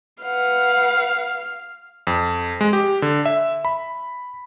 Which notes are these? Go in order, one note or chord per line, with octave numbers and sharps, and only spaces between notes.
B4 F5 F#5
F2
G#3
G4
D3
E5
B5